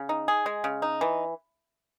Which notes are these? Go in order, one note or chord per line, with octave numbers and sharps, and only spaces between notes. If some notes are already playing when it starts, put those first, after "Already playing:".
Already playing: C#3
D#4
G#4
G#3
C#3
D#4
E3